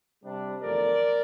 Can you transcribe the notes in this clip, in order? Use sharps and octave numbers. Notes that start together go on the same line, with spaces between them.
C3 G3 D4
E2 D3 F3 A3 A#4 D5